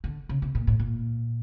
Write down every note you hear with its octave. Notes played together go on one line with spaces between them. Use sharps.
D3
C#3
C3
A#2
A2
A#2